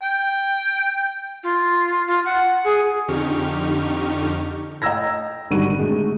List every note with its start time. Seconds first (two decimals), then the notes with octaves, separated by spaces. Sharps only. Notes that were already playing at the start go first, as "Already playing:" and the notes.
0.02 G5
1.44 F4
2.07 F4
2.25 F#5
2.64 G#4
3.08 F2 D3 D#4 G4 C#6 F6
4.82 D#5 G5 A#5 E6 G#6 A#6
5.51 G#1 D3 G3 F#4 D#7
5.79 G#3 A3